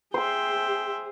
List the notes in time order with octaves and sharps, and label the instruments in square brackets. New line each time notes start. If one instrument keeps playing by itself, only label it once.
[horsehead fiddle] G#4 [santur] C5 C6 [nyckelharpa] E5 G5